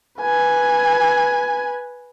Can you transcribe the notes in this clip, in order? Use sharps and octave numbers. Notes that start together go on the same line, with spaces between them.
B4 G#5